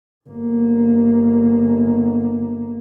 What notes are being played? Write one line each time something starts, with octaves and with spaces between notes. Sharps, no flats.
G1 A#3